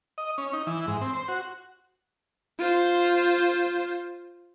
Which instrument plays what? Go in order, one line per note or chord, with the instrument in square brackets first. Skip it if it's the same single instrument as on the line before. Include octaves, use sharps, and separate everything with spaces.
[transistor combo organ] D#5
C#4
D#4
E3
G#2
C4
C5
F#4
[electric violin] F4 C5